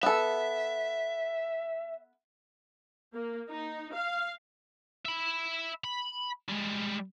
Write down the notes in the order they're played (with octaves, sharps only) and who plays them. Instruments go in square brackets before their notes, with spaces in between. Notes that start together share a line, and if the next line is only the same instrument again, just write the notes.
[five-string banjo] B3 A4 [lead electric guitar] E5
[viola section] A#3
D#4
F5
[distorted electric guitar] E5 B5
B5
G3 G#3